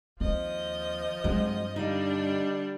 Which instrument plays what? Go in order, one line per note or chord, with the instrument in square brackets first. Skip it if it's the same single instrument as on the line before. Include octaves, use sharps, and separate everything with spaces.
[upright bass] D#2 C4 [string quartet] F3 D#5
[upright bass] G2 C4 [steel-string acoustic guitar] F#3 G#3
[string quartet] D3 G3 D4 [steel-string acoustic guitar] D#4 D#5 F5